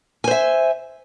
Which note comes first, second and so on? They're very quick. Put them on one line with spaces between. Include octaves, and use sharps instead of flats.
G#5 C5 E5